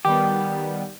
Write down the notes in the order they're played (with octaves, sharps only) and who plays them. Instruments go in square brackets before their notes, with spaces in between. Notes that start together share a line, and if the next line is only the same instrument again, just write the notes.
[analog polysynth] D#3 G3 B3 [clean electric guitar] G4